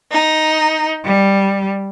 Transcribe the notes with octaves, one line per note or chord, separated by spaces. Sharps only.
D#4
G3